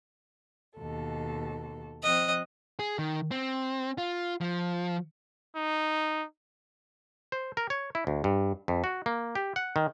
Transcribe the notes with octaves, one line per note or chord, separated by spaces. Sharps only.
D#2 B2 A4
F3 C4 D#5 F#6
G#4
D#3
C4
F4
F3
D#4
C5
A#4
C#5
E4
D2
G2
F2
F#4
A#3
G4
F#5
D#3